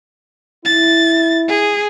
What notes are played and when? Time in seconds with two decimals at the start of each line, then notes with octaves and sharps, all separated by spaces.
0.65 E4 A6
1.48 G#4